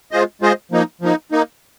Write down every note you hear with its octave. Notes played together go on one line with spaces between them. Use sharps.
G#3 F4 G#4 C5 D#5
G#3 F4 G#4 C5 D#5
F3 A#3 D#4
F3 A#3 D#4
A#3 D#4